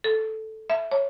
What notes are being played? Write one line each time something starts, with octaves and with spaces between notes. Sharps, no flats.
A4
E5
C#5